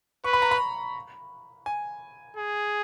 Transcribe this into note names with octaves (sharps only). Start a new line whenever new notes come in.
B4 C#6
B5
A#5
B5
G#5
G#4